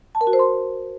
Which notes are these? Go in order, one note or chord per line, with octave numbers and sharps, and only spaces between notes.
A5
A#4
F#4
C5
C6